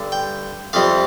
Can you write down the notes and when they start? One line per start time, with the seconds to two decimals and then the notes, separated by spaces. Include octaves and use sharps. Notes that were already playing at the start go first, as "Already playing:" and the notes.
Already playing: G2 D3
0.12 G5
0.73 F2 C3 G3 F5